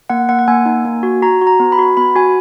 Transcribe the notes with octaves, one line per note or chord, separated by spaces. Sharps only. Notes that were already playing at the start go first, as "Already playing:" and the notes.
A#3 F#5
A#3 F#5
F#5
A#3 G#5
D#4
A#3
F#4
F#4 A#5
F#4
A#5
B3
B5
F#4
B3 B5
F#4 G#5